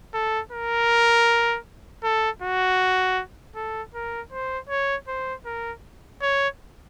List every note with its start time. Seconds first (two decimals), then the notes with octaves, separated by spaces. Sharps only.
0.14 A4
0.52 A#4
2.04 A4
2.42 F#4
3.56 A4
3.95 A#4
4.32 C5
4.69 C#5
5.08 C5
5.46 A#4
6.22 C#5